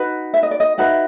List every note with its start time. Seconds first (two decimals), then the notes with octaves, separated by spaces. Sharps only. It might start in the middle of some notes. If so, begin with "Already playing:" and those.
Already playing: D#4 F#4 B4
0.34 E5
0.43 D#5
0.51 D5
0.60 D#5
0.78 D#4 F#4 B4 E5